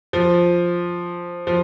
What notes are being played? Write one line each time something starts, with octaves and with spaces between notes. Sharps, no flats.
F3
F3